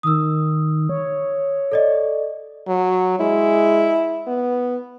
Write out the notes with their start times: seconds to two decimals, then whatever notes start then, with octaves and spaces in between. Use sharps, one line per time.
0.03 D#3 D#6 E6
0.89 C#5
1.72 A4 D5 D#5
2.68 F#3
3.20 G#3 E4
4.27 B3